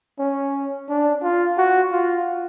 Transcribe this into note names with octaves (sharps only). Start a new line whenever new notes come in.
C#4
D4
F4
F#4
F4